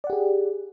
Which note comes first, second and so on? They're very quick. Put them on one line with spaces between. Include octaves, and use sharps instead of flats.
D5 F#5 G4 G#4